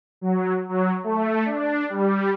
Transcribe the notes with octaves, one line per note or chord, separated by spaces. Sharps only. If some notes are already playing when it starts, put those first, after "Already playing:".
F#3
F#3
A3
D4
G3